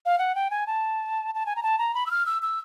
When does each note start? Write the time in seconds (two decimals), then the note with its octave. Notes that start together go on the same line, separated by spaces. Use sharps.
0.06 F5
0.19 F#5
0.35 G5
0.50 G#5
0.67 A5
1.35 A5
1.46 G#5
1.56 A#5
1.63 A5
1.79 A#5
1.94 B5
2.06 E6
2.11 F6
2.26 E6
2.42 E6